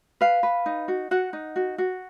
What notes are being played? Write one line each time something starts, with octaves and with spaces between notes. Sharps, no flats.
B4 F5
B4
D#4
F#4
F#4 F#5
D#4
F#4
F#4